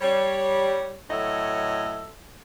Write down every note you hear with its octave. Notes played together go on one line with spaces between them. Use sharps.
G3 C#5
A2 F#3 A4 C#5 D#5 E5